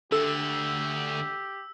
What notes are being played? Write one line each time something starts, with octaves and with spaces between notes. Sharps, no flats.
D2 D3 G4 A4 E6